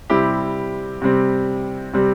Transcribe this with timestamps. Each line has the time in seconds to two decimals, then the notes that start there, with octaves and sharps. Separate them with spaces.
0.10 C3 G3 C4 E4 G4
1.02 C3 G3 C4
1.93 C3 G3 C4